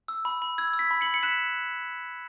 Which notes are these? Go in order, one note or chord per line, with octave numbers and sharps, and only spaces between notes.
E6
B5
B5
E6 G#6
E6
B6
B5
C#7 F#7
B5
C#7
F#6 B6 E7